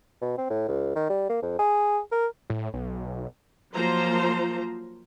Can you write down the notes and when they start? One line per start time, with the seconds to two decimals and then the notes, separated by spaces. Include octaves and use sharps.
0.21 B2
0.38 C4
0.50 A2
0.68 C#2
0.96 D#3
1.10 G3
1.30 A#3
1.42 F2
1.59 G#4
2.12 A#4
2.50 A2
2.73 B1
3.74 F3 F#3 A#3 F4 C5 A#5